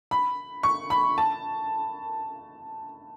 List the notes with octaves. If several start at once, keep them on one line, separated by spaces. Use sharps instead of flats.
B5
C#6
B5
A5